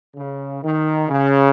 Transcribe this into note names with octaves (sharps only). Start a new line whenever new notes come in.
C#3
D#3
C#3